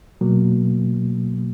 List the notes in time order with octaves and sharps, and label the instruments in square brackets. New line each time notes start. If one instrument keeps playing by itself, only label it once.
[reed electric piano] B2 F#3 A#3